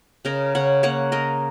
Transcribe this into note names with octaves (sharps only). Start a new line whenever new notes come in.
C#3 A#4 D#5
C#3 C#5 F#5
A#3 C#5 F#5
A#3 A#4 D#5